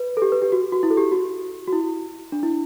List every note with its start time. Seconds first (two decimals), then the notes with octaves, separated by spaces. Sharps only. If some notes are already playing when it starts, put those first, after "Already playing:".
Already playing: B4
0.17 A4
0.22 G4
0.32 B4
0.42 G4
0.52 F#4
0.72 F#4
0.83 E4
0.91 A4
0.97 G4
1.12 F#4
1.67 F#4
1.73 E4
2.32 D4
2.43 E4